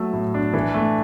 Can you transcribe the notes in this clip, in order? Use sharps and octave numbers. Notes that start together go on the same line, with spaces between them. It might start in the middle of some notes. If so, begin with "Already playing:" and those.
Already playing: F#3 A3 E6
A2
D4
E3
A3